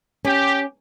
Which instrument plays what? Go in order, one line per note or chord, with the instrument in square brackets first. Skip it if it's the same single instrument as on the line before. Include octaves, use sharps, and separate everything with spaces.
[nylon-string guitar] C#4 [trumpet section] G4